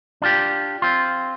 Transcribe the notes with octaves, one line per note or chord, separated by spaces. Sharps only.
D4 F4 G4
C4 F4